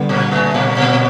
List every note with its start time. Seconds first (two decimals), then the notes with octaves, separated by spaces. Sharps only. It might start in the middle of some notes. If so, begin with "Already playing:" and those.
Already playing: D3 G3 B3 D4
0.09 A#2 A#3
0.31 A2 A3
0.54 A#2 A#3
0.68 A3
0.76 A#2 A#3